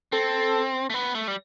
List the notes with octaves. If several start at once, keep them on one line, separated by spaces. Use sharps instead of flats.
C4 A4
A3
B3
A3
G3